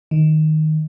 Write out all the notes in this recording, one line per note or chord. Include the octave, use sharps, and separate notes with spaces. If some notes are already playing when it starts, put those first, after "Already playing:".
D#3